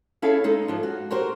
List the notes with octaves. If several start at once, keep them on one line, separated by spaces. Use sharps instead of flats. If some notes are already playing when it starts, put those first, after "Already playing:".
C#4 E4 G#4 A4 E5 F5
G#3 D#4 A4
G#2 F3
F#4
F#4 G4 A#4 C5